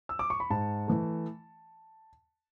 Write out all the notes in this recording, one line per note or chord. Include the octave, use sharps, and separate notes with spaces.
E6
D6
C#6
B5
G#2 A5
E3 A3